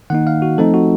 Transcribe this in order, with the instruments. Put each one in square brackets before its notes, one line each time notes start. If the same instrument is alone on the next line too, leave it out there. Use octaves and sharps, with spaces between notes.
[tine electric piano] D#3 A#3 D#4 F#5
F5
F#4
F3 A3 C4 D#4 A4
F#4